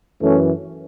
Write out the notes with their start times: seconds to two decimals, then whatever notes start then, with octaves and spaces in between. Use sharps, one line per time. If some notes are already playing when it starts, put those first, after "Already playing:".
0.21 F#2 E3 A3 C#4